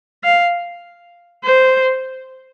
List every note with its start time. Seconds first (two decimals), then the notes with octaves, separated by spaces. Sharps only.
0.24 F5
1.44 C5